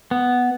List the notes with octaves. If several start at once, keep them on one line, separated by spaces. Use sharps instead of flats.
B3